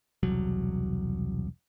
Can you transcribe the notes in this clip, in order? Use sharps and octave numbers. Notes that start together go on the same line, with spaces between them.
E1 C2 F#3